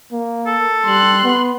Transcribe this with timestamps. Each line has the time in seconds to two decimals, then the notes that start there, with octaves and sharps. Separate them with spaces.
0.13 A#3
0.47 A4
0.86 G3 C6 F#6
1.24 B3